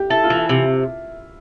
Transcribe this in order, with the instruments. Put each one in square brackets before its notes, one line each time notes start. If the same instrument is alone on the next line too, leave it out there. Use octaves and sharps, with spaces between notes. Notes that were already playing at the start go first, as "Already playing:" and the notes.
Already playing: [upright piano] G4
[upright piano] E4 [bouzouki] A4
[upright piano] F4
[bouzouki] E3
[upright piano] E4
[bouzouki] C3